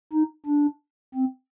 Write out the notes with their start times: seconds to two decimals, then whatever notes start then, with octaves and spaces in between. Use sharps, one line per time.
0.13 D#4
0.46 D4
1.14 C4